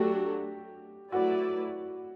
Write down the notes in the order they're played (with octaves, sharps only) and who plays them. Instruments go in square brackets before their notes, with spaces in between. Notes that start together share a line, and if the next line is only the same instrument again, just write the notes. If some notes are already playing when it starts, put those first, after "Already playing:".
Already playing: [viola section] F#3 A3 D4 F#4 [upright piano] G4
[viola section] F#3 A3 E4 B4 D5 [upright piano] F#4